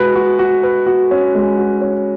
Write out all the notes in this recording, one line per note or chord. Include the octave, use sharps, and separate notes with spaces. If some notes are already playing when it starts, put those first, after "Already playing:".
Already playing: G#3 F#4 B4
F#4
F#4
B4
F#4
C#4
G#3
F#4
C#4